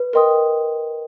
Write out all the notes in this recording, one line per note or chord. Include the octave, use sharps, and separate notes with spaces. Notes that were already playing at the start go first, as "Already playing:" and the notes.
Already playing: B4
A#4 D#5 G5 C6 D#6